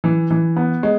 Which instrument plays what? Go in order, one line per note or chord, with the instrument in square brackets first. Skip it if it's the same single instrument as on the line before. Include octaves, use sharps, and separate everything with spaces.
[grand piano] E3
E3
B3
G#3